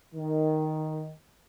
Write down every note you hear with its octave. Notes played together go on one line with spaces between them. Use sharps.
D#3